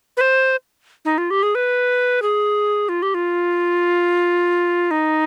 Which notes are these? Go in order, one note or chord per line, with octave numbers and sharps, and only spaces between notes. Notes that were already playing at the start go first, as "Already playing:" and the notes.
B4
C5
D#4
F4
G4
G#4
B4
G#4
F4
G4
F4
D#4